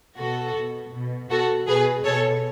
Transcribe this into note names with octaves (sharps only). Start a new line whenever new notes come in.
B2 F#4 A4
B2
B2
B2 F#4 A4
B2 G#4 B4
B2 A4 C#5